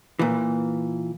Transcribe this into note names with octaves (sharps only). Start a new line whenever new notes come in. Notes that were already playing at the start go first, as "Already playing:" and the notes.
A#2 E3